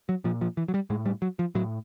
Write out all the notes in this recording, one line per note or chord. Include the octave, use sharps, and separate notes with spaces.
F#3
A#2 F3
F3
E3
F#3
G3
A2 G#3
G3
F#3
F3
A2 F#3